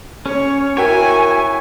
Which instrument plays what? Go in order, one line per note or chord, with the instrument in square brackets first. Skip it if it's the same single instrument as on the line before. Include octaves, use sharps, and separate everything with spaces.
[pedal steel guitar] C#4 [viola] C#5
[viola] E4 G#5 [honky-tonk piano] F#4 A#4 G5 [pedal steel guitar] C#5 E5